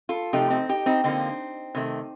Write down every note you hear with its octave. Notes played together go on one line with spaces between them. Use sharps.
F4 A4
C3 F3 A3 D#4 G4
C4 D#4
D#4 G4
C4 D#4
D3 F3 A#3 C4 D#4
C3 D#3 A3